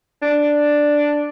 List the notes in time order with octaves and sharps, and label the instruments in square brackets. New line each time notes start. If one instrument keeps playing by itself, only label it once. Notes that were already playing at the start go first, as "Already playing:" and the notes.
[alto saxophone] D4